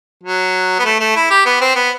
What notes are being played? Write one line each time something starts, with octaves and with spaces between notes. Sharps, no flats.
F#3
B3
A3
A3
E4
G4
B3
C4
B3